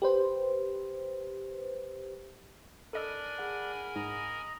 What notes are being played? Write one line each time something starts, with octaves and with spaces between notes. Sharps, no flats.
G4 B4 C5
D4 A4 A#4 D#5 G#5 B5 E6
G#4 F#5
G#2 D#5 A#5